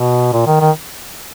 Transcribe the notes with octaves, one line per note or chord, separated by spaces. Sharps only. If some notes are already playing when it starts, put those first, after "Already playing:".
Already playing: B2
A#2
D#3
D#3